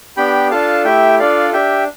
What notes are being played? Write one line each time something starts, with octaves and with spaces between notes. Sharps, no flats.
B3 D4 G4 G5 B5
D4 F4 A4 F5 A5
A3 E4 G4 E5 G5
D4 F4 A4 D5 F5
D4 G4 E5 G5